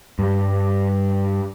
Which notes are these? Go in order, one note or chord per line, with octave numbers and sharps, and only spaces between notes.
G2 G3